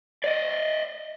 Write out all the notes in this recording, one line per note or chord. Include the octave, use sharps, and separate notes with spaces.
D5 D#5